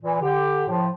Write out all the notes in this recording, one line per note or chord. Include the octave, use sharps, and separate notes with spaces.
A#2 E3
D3 G4
A2 F3